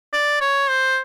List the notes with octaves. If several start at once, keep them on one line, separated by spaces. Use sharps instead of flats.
D5
C#5
C5